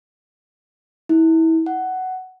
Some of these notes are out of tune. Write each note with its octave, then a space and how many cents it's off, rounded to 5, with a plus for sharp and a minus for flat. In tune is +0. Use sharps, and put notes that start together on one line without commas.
E4 -25
F#5 +10